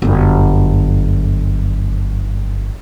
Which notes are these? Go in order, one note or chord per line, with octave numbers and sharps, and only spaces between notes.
G1 F#2